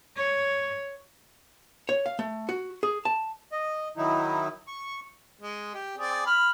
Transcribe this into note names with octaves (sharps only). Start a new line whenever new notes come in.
C#5
C#5
F5
A3
F#4
G#4
A5
D#5
D#3 F#3 D#4 E4
C#6
G#3
G4
C4 G#4 D5
B5 F6